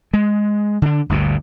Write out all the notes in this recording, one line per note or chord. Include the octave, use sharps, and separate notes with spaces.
G#3
D3 D4
G1 D2 G2 A#2